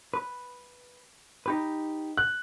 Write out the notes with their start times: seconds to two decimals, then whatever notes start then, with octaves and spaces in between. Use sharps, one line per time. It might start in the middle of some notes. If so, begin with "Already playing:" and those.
0.14 B4
1.46 D#4 G4 B4
2.17 F#6